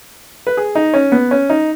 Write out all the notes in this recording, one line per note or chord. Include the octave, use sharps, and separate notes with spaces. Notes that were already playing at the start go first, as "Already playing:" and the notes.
B4
G#4
D#4
C#4
B3
C#4
D#4